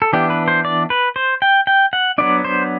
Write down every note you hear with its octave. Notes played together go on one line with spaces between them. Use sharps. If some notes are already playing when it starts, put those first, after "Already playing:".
A4
E3 B3 D4 G4
B4
C5
D5
B4
C5
G5
G5
F#5
F#3 B3 D4 D5
C5